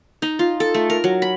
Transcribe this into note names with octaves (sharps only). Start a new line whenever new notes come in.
D#4
F4
A4
A3
A#4
F#3
B5